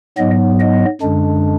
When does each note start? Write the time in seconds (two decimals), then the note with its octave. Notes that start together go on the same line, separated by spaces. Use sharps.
0.17 G#2 F#3 B3 D#5
0.59 D#5
1.02 F#2 D3 G#3 D4